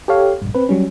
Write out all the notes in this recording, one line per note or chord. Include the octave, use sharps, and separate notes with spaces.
G4 A4 C#5 F5
A#1 G2
C4 B4
F#3 G3 C#4